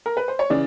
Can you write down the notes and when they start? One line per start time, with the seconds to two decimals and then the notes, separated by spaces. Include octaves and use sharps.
0.06 A#4
0.17 B4
0.28 C5
0.39 C#5
0.50 C#3 E3 D5